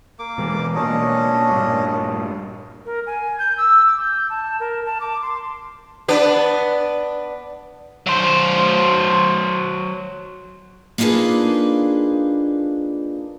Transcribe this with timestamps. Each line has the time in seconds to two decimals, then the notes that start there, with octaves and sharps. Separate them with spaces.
0.19 A#3 D6
0.38 B2 E3 G#3
0.75 B2 A#3 C#4 D4 D#5
1.51 G2 A#2
2.85 A#4
3.06 G#5
3.39 G6
3.57 E6
3.86 D6
4.00 G6
4.29 A5
4.60 A#4
4.85 A5
5.00 D6
5.22 C6
6.08 B3 D4 B4
8.07 F#3 C5
10.98 A#3 D4 D#4 F4 G#4 B4